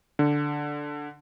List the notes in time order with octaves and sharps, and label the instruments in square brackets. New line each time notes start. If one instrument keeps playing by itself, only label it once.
[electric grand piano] D3